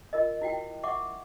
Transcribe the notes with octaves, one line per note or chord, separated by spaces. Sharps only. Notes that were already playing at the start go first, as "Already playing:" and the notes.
F4 A#4 D#5
E4 F#4 G5
E5 F#5 C#6 D6